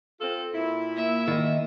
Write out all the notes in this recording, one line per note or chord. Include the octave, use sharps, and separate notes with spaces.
C4 F4 A4
A#2 E4
A#3 E5
D#3 D#5